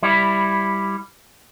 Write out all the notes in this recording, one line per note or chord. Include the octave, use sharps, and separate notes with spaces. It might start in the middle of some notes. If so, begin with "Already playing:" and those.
G3 E4